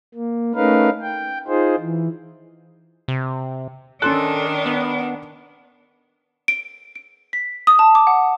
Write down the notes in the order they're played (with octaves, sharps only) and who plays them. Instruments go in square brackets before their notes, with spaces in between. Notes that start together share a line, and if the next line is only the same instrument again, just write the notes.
[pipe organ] A#3
A3 C#4 D#4 A#4 B4 F5
G5
D#4 F4 G#4 C5
E3
[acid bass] C3
[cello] D#3 D4 [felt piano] C#4 C6 F#6 [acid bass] A4
[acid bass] B3
[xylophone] D7
D7
B6
D#6
A5
D6
F#5